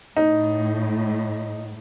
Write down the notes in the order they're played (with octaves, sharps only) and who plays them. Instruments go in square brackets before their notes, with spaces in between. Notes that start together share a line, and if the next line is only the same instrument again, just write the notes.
[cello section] A2 [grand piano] D#4